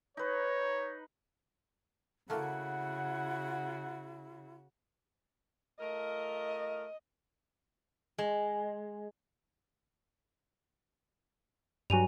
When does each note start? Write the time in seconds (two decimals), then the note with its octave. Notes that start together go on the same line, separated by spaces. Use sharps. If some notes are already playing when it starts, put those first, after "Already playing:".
0.17 D#4 B4 C#5
2.30 C#3 A3 A#3 E4 F#4 F#5 A5
5.80 A3 F4 A#4 D#5
8.18 G#3
11.90 G2 F#3 G#5 D#7 F7